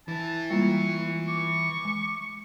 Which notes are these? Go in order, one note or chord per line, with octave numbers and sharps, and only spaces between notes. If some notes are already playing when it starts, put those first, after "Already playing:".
E3 E4 A5
G3 G#3 A#3 F4 C#6
C#6 D6
G#3